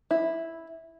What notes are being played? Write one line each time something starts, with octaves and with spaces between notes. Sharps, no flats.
E4